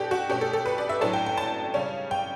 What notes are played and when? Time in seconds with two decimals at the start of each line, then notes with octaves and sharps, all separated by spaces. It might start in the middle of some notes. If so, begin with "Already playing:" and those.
Already playing: B2 D4 G4 A4
0.11 F#4
0.29 B2 A3 C#4 G4
0.41 A4
0.53 A4
0.66 B4
0.78 D5
0.89 E5
1.01 A2 F#3 A3 D4 A5
1.13 G5
1.26 G5
1.38 A5
1.74 C#3 G3 C#4
2.11 G5